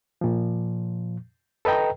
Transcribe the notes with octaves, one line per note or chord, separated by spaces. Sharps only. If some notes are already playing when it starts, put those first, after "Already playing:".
A#2 F3
A4 B4 D#5 G5 A#5